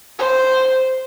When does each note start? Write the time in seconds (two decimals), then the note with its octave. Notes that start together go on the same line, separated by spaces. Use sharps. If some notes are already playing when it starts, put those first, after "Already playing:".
0.19 C5